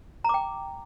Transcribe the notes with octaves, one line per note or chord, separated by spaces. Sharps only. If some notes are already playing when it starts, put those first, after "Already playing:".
G5 A#5 D6